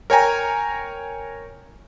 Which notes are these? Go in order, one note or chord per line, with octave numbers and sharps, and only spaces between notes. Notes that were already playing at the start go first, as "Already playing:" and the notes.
A#4 C#5 G5 G#5 A#5